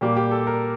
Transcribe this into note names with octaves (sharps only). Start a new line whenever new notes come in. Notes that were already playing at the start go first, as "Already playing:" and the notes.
A#2 G3 A#3 G4
G4
A4
A#4